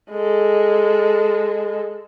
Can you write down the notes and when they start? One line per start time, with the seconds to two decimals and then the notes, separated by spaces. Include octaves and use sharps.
0.12 G#3 A4